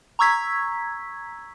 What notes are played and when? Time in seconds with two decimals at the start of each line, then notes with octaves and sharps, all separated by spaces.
0.19 A#5 C#6 E6 G#6 B6